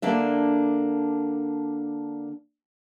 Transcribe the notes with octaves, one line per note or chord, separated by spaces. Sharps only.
D3 A#3 D4 E5